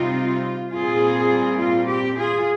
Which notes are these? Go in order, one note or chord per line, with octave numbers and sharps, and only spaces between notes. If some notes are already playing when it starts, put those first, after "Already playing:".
Already playing: C3 G3 C4 D#4 F4
A#2 G3 C4 F4 G#4
F4
G4
F4 G#4